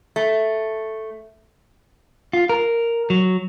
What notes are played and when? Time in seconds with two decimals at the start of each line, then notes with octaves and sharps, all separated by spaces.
0.16 A3
2.33 F4
2.49 A#4
3.10 F#3